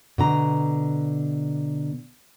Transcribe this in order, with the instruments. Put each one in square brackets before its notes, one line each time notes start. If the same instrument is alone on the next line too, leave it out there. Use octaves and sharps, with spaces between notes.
[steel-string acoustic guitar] B2 D3 A#5